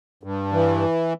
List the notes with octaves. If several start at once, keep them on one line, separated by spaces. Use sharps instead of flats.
G2
E3